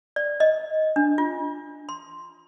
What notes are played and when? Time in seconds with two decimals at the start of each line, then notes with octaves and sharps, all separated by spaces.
0.16 D5
0.40 D#5
0.96 D4
1.18 F4
1.89 C6